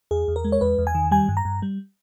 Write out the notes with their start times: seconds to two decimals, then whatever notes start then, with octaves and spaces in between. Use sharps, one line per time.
0.11 E2 G#4
0.28 E2
0.36 A#4
0.44 G#3
0.52 C#5
0.61 E2 B4
0.78 E2
0.87 G#5
0.95 D#3
1.11 G3 G#5
1.29 G2
1.37 A#5
1.45 G2
1.62 G3